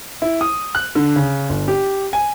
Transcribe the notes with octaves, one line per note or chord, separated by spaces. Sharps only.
E4
D#6
F#6
D3
C#3
G1
G4
G#5